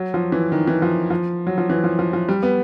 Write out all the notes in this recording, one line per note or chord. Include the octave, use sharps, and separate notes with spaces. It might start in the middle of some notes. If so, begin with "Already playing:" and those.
Already playing: F#3
F3
E3
D#3
E3
F3
F3
F#3
F3
E3
F3
F3
F3
G3
B3